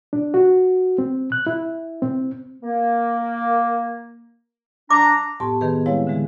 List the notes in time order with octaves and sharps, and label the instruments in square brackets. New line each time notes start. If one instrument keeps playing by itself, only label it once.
[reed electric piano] D4
F#4
C4
F#6
E4
C4
[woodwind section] A#3
[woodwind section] D4 [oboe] A#5 [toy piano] D6
[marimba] F2 A2 B3 G4 A5 C6
D#3 B3 G#4 B4
G3 G#3 C4 E4 C#5 F5
D3 E3 G#3 G#4